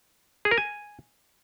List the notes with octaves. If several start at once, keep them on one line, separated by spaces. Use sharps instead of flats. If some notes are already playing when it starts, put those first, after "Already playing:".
G#4
A#4
G#5